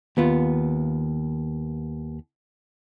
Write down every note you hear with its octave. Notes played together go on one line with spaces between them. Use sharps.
D#2 B3 F4